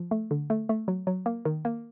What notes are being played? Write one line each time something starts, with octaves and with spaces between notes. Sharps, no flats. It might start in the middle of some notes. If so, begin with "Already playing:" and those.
Already playing: F3
A3
D3
A3
A3
F#3
F#3
A#3
D#3
A#3